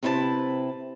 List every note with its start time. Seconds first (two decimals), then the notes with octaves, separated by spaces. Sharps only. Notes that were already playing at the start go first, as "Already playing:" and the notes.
0.03 C3 C4 E4 B4 C5 A5